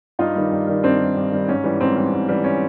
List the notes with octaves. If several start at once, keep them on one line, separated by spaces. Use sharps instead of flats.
G2 D#4 F4
D#3 G3
G2
D#3 G3
G2 C4 D4
D#3 G3
G2
D#3 G3
G#2 C#4
E3 G3
G#2 C4
E3 G3
G#2
E3 G3
C#4